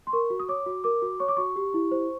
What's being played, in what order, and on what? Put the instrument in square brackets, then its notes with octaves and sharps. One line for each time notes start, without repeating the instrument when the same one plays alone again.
[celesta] C6
A#4 C#6
F#4
D#6
C#5 D6
F#4
A#4 D6
F#4
C#5 C#6
D6
F#4 C#6
G4
E4
C5